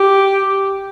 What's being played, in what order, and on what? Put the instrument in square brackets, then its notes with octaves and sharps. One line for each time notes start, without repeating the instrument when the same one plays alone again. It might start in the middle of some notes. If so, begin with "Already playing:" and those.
Already playing: [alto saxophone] G4